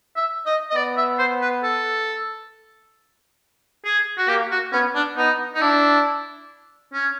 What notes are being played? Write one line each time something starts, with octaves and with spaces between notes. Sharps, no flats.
E5
D#5
D#5
B3 D5
E5
C5
B4
A4
G#4
F#4
A#3 G4
F#4
B3 C#4
D4
B3 D#4
D#4
D4 E4
C#4